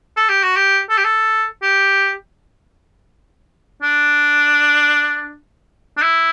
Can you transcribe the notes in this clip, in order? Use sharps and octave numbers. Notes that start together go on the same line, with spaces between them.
A4
G4
F#4
G4
A4
G4
A4
G4
D4
D4
E4